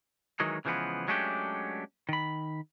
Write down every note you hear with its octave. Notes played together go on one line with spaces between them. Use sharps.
D#3 E3 F#3 G#3 D#4
C#3 E3 F3 G#3 B3
F#3 G#3 A3 C#4 D4 G4
D#3 B5